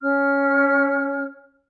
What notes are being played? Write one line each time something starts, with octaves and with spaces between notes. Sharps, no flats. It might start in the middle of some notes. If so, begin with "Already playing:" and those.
C#4 C#5 F6